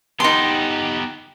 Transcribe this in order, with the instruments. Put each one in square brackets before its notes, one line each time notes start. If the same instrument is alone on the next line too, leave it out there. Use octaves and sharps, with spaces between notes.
[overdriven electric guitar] B3 G4 [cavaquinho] D#4 C6